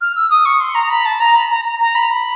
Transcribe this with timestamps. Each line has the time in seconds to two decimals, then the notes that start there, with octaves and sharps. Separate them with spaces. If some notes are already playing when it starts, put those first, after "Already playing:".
0.01 F6
0.16 E6
0.30 D#6
0.45 C#6
0.60 C6
0.75 A#5
0.90 B5
1.05 A5
1.20 A#5
1.35 B5
1.50 A#5
1.65 A#5
1.80 A#5
1.95 B5
2.10 B5